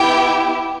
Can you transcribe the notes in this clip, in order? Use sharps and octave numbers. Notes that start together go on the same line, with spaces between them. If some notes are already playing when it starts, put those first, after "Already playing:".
Already playing: B3 E4 G4 G5